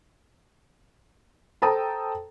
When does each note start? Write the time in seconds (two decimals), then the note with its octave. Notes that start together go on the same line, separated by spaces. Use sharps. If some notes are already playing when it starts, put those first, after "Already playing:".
1.62 A4 C5 G5 A5 A#5 D#6